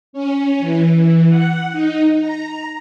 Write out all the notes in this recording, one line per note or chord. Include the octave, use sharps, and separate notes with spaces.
C#4
E3
F#5
D#4
A#5